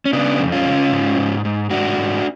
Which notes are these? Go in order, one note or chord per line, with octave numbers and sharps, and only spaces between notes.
C#4
C#3 B3 D4
F2
C#4 F4
C#3
G#2
G#2
G#2
G#2 D4 F#4
G#2